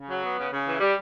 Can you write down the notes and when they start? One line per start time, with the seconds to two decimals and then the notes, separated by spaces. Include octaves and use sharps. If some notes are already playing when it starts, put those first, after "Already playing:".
Already playing: C#3
0.09 F#3
0.23 B3
0.38 C#3
0.52 C#3
0.67 E3
0.80 G3